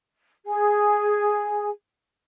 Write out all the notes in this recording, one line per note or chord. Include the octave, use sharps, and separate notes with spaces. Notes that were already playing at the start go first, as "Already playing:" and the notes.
G#4 G#5